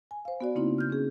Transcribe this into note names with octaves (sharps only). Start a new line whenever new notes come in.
G#5
C5 F5
B3 F#4 D5
C#3 A#3 C4 D#4 E4
F6 G6
C#4 G#4